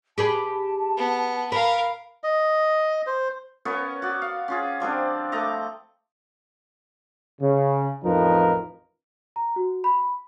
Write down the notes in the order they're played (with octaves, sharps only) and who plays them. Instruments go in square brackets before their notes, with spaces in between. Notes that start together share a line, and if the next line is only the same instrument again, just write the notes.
[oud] G4 G#4 B4 [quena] A5
[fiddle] B3
[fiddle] A#4 F5 [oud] B4
[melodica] D#5
C5
[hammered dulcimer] B3 C#4 A#4 C#5
F#4 D5
F5
C#4 F4 G#4
F3 G3 C4 D4
A3 D#5 A#5 D6
[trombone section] C#3
A1 F2 F3 D#4 A#4 B4
[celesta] A#5
F#4
B5